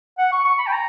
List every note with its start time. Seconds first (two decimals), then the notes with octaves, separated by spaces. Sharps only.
0.18 F#5
0.32 C#6
0.45 C#6
0.58 B5
0.67 G5
0.72 A#5